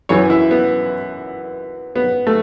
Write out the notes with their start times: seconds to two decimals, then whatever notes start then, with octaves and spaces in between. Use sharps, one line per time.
0.09 F#2 E3 C#5
0.30 E4
0.51 B3
1.96 B3
2.27 A3